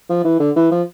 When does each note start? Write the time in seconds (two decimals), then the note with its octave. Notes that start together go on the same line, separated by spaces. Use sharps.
0.09 F3
0.24 E3
0.40 D3
0.56 E3
0.71 F3